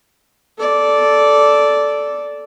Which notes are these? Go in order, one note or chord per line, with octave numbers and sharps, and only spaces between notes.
A4 D5